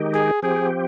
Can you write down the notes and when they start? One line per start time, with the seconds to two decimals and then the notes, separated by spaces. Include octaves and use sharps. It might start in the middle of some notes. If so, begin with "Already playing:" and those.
Already playing: D#3 G#3 D#4 G4
0.14 G#4
0.42 F3 C4 G4 G#4